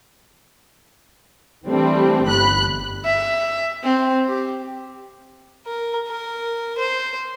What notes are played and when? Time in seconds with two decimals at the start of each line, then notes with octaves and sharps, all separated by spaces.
1.68 E3 G3 A3 C4 D4
2.26 G1 B5 F#6
3.05 E5
3.84 C4
4.28 G4
5.67 A#4
6.08 A#4
6.78 C5